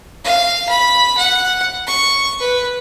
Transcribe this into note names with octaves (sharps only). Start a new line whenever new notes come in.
F5
B5
F#5
C#6
B4